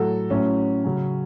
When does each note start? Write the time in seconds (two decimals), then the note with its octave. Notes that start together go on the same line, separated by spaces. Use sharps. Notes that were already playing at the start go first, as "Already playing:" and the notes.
Already playing: A2 F#3 F#4 A4
0.30 A2 F#3 C#4
0.84 C#3 F#3